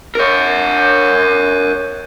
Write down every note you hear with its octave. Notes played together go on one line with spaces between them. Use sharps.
A#4 C#5